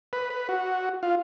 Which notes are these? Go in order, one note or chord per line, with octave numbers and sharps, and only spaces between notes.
B4
B4
F#4
F4